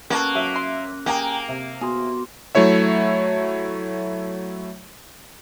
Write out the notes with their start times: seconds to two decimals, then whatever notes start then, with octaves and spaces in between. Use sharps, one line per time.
0.10 B2 A#3 C#4 F#4 A4 F#6
0.35 F#3 E5 D#7
0.56 C6
1.06 A#3 G4 G#4 G5 G#5 A#5
1.49 C3
1.81 B3 F#4 G#4 C6
2.55 F#3 A3 E4 C#5 E5